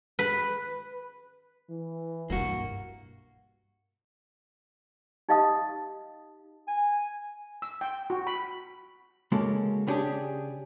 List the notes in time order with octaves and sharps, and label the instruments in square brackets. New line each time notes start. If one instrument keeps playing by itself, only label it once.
[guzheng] B4
[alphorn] E3
[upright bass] G2 B2 [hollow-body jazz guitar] A#3 F#4
[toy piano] D#4 G4 D#5 F5 A5 D#6
[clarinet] G#5
[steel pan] E6
G5
F#4
B5
[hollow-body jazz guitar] C#3 G#3 A#3 C#4 F#4 A4
C#3 B3 C#4 D4 G4 G#4